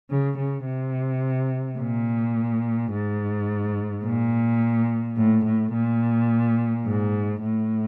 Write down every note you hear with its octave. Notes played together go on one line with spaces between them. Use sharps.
C#3
C#3
C3
A#2
G#2
A#2
A2
A2
A#2
G#2
A2